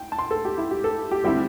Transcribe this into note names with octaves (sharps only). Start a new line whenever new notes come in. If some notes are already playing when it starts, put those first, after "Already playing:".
Already playing: G5
A5
C6
A4
G4
E4
G4
A4
G4
D3 G3 C4 E4 G4